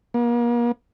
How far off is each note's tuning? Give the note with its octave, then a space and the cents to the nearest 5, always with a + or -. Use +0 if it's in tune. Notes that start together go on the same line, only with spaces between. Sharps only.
A#3 +40